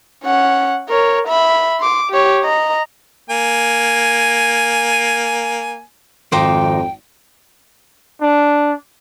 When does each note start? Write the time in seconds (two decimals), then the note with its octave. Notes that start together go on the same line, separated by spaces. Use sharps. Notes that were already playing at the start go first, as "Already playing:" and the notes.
0.24 C#4 F#5
0.89 A#4 C#5
1.28 E5 B5
1.80 C6 D6
2.10 G4 C#5
2.42 D#5 A#5
3.30 A#3 G#5
6.32 G#1 F2 D#4 C5 G5 D6
8.22 D4